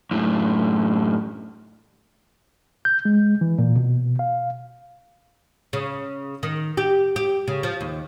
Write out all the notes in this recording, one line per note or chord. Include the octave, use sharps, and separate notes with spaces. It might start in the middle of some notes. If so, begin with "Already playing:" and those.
F#2 A2
G6
G#3
E3
A#2
B2
F5
C#3
D#3
G4
G4
C#3
F3
D#2